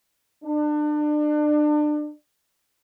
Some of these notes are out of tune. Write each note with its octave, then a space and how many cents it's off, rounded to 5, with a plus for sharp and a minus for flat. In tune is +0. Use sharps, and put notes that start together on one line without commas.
D4 +30